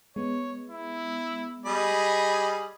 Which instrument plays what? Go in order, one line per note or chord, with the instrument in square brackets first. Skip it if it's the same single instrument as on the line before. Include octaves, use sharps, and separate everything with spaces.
[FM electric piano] G#3 B3 [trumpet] C#5
[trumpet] E4
[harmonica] G3 D#5 B5 [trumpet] G#4